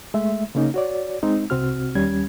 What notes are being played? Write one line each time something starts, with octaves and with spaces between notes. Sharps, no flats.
G#3 A3 E5
C#3 A#3 C#4 D#4
F#4 C#5 D5
G#3 C4 D#4
C2 C3 C4 F#4 F6
D#2 G3 C#4 G#6